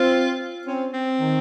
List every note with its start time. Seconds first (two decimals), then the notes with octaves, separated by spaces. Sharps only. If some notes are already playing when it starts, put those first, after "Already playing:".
Already playing: C4 F4
0.66 C4 C#4
0.93 C4
1.20 D#3